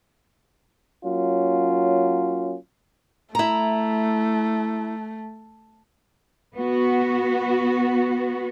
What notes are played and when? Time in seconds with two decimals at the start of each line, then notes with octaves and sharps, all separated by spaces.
1.05 F#3 A#3 C#4 F4
3.35 A3 E4 A#5
6.56 B3 F#4